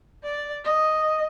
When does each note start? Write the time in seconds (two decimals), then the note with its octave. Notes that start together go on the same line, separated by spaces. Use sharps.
0.23 D5
0.65 D#5